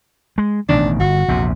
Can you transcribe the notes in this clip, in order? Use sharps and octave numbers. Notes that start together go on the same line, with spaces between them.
G#3
A1 B2 D#3 D4
G1 F#4
A#1 E2 C3